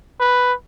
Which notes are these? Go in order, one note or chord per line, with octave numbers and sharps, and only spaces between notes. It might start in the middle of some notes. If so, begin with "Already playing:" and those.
B4